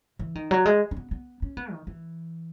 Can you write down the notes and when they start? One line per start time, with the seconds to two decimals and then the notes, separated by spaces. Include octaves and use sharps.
0.19 E3
0.35 D#3
0.51 F#3
0.66 G#3
0.91 C#4
0.97 B3
1.11 B3
1.42 C#4
1.57 B3
1.72 D#3
1.87 E3